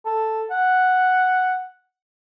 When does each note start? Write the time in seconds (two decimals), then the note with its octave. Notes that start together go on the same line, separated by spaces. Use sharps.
0.05 A4
0.51 F#5